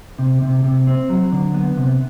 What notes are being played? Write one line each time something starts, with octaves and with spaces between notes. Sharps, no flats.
C3
C3
C3
C4
F#3
D3
B3
C3